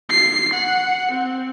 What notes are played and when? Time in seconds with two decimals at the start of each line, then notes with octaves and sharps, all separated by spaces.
0.11 C7
0.54 F#5
1.12 C4